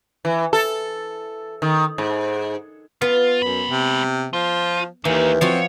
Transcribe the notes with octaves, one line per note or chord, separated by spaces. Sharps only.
E3
A4
D#3
G#2
B3 F4
F#2 G#3 B5
C3
F3 F4
D#2 E3 A#3 G4
F3 C4 F4 F#4 C#5